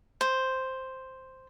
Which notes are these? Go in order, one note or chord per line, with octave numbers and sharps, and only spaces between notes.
C5